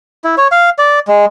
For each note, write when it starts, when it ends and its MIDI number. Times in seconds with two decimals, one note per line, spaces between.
0.24 0.35 64
0.37 0.48 73
0.52 0.70 77
0.78 0.99 74
1.08 1.26 56